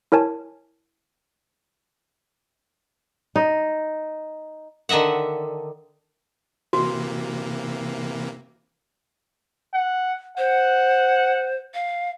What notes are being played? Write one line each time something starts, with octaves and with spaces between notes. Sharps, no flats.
E4 A#4 C#5 G#5 A5
D#4
D3 D#3 D#5 E5 F#5
C3 E3 A#3 F#4
F#5
C5 F#5
F5